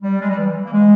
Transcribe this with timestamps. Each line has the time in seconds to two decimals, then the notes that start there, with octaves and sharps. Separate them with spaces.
0.02 G3
0.21 G#3
0.29 G3
0.37 E3
0.64 A#3
0.72 G#3